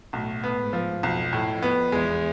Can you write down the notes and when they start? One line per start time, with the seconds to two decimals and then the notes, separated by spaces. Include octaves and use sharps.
0.13 B1 A2
0.44 B3
0.58 G#2
0.73 F3
1.03 B1 F2
1.33 A2
1.49 F2
1.62 B3
1.92 E2 G#3